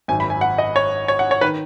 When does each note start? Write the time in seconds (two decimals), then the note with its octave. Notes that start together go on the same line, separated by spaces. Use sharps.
0.08 G#1 F#2 D#3 G#5
0.20 B5
0.30 G#5
0.41 F#5
0.58 D#5
0.76 C#5
1.08 C#5
1.19 F#5
1.31 C#5
1.41 D#3 B4